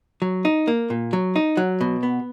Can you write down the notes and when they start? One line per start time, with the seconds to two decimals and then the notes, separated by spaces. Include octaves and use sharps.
0.22 F#3
0.45 D#4
0.67 A#3
0.90 A#2
1.13 F#3
1.36 D#4
1.57 F#3
1.81 B2
2.03 B3